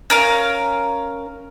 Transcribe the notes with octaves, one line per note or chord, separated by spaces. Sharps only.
C#4 A#4 F5